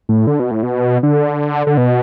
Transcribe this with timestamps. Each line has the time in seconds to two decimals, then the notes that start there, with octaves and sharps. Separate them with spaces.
0.09 A2
0.27 D3
0.40 B2
0.51 A2
0.63 B2
1.03 D3
1.67 D3
1.78 B2